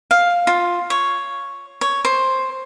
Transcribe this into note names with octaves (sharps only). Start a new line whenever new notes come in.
F5
F4
C#5
C#5
C5